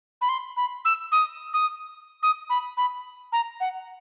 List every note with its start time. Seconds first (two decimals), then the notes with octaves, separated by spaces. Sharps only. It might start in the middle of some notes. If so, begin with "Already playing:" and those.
0.21 B5
0.29 C6
0.57 B5
0.85 E6
1.12 D#6
1.54 D#6
2.23 D#6
2.50 B5
2.77 B5
3.32 A#5
3.60 F#5